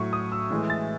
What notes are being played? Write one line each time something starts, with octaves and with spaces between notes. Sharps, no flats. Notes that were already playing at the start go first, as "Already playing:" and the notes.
Already playing: A2 F#3 C#6
D#6
E6
A2 E3 G#3
A6